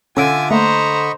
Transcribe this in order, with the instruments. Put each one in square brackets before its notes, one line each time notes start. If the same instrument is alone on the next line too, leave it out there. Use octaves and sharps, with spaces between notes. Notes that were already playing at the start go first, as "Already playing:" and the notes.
[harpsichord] D3 [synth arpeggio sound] C#4 E6 D7 [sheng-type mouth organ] F4 E5 D6 [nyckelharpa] G#5
[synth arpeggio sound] A3 A#3 [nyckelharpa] C5 A#5 [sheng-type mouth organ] D#5 B5 C#6